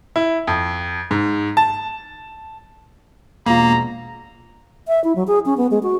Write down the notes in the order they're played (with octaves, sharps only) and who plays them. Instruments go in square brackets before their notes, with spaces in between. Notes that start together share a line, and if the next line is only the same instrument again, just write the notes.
[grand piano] E4
F2
G#2
A5
[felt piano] E1 F4 [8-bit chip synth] A#3 [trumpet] A#5
[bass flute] E5
E4
F#3
G#4
C#4
B3
G#3
F#4